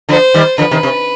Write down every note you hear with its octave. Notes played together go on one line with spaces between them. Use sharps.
D3 F3 C5
D#3 G3
D3 F3 B4
C3 D#3
C3